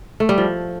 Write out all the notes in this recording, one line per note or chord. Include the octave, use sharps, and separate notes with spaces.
A3
G3
F3